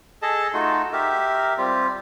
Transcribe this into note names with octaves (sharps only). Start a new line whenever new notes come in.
G#4 A4 D#5 A5
A3 D#4 F4 F#4
G4 A#4 E5
G3 C4 F4 G4